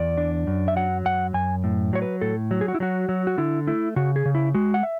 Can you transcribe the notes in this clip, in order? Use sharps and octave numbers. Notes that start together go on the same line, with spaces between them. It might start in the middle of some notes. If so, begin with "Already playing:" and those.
Already playing: E2 D5
D4
F#2
E5
F#3 F#5
F#2 F#5
F#2 G#5
A2
F#3 C#5
B4
A2 A4
F#3
G#4
F#4
E4
F#3 F#4
F#3
F#4
D3 E4
A3 E4
C#3 F#4
G#4
C#3
E4
G#3 F#4
F#5
E5